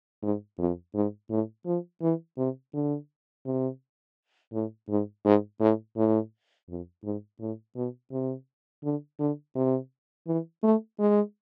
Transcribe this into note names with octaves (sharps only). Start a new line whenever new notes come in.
G#2
F2
G#2
A2
F3
E3
C3
D3
C3
A2
G#2
G#2
A2
A2
F2
G#2
A2
B2
C3
D3
D3
C3
E3
A3
G#3